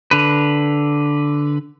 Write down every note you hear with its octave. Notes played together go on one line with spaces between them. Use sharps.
D3 B4